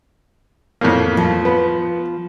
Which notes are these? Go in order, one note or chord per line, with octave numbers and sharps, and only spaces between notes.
F2 A2 A#3
F3
B3